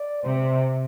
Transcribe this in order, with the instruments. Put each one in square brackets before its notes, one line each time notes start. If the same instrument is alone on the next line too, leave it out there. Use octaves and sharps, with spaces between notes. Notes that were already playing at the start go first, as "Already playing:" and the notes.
Already playing: [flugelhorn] D5
[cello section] C3 [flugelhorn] C5